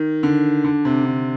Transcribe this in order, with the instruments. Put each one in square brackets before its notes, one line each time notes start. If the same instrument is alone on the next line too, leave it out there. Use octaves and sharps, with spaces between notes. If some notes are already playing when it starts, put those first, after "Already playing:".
Already playing: [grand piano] D#3
D3
D3
C3
D3